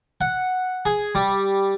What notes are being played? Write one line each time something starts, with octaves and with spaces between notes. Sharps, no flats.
F#5
G#4
G3